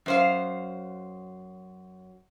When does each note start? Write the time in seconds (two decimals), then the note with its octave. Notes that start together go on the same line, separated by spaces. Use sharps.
0.06 F#2 C5 F5